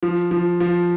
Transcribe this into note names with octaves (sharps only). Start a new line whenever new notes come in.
F3
F3
F3